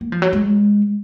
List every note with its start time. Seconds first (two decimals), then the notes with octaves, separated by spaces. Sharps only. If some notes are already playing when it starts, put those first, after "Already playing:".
0.01 A#3
0.12 F3
0.22 F#3
0.33 G#3